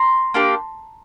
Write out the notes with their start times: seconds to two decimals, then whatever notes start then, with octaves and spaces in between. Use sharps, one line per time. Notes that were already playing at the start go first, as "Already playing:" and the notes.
Already playing: A#5 C6
0.34 A#3 D4 G4